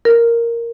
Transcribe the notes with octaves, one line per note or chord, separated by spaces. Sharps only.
A#4